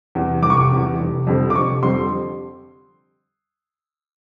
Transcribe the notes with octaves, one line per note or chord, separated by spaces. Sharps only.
E2 C3
F1 D6
C#6
D6
E2 C3
F1
F2 D3 G3 C4
D6
F1 C#6
F2 D3 G3 C4 C6